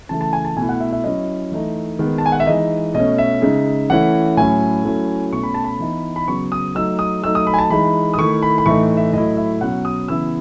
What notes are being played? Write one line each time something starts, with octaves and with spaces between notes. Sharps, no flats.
C#3 E3 A3 A5
A5
G#5
A5
B2 A3 E4 G#5
F#5
E5
E5
F#3 C#4 E4 D#5
E3 A3 D#4
D#3 G#3 B3
A5
G#5
F#5
E5
E3 G#3 D#4 D#5
B2 A3 C#4 D#5
E5
C#3 G#3 D#4
E3 A3 C#4 E4 F#5
A2 F#3 A3 C#4 E4 G#5
F#3 A3 C#4 E4
B2 A3 C#4 C#6
B5
A5
B5
E3 B3 D#4
B5
C#3 F#3 B3 C#6
D#6
F#3 A3 D#4 E6
D#6
F#3 A3 D#4 E6
D#6
B5
G#5
A5
E3 G#3 D#4 B5
D#6
D#3 A3 E4 C#6
B5
B5
A2 E3 A3 D#4 C#6
E5
A2 F#3 A3 E4 D#5
E5
B2 F#3 C#4 F#5
D#6
C#3 E3 B3 E4 E6